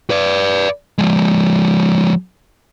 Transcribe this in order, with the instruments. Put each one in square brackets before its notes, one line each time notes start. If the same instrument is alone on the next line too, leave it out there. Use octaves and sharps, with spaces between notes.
[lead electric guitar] B4 D5
F3 G#3